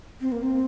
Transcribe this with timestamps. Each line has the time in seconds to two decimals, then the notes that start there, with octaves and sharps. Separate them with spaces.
0.21 C4
0.32 A#3
0.43 C4